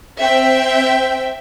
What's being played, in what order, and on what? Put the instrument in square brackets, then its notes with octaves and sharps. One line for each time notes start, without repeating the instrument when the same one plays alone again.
[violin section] C4 E5 G5